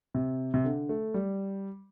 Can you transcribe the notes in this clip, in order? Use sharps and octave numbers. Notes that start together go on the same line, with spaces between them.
C3
C3
D3
A3
G3